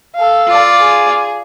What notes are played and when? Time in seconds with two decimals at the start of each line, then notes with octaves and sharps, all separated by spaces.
0.15 A4 F5
0.47 F4 D5
0.81 G#4